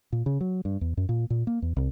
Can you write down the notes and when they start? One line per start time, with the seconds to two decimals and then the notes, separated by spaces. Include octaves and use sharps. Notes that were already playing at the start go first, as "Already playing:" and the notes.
0.12 A#2
0.26 C#3
0.41 F#3
0.65 G2
0.81 E2
0.97 F#2
1.09 A#2
1.30 A#2
1.47 A#3
1.62 E2
1.77 C2